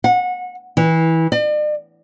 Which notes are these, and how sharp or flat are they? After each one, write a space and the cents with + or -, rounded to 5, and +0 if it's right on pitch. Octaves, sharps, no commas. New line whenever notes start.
F#5 -30
E3 -20
D5 +45